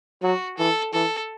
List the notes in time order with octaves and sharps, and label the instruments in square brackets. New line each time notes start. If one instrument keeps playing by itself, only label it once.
[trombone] F#3 [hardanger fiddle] F#4
[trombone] E3 [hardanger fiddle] A4
[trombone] E3 [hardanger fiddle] A4